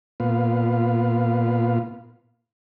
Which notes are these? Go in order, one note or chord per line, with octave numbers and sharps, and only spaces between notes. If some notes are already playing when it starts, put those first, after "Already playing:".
A#2 B3 F4